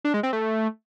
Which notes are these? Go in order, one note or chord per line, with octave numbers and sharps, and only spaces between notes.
D4
G#3
C4
A3